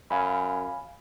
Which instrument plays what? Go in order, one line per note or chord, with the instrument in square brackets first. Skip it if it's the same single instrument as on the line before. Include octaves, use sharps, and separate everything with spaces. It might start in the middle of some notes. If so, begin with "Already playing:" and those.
[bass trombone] F#2 [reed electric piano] F5 G#5 B5